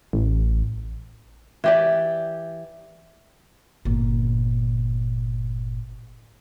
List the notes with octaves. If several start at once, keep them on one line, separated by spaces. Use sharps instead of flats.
A1
E3 G4 D5
G1 A#2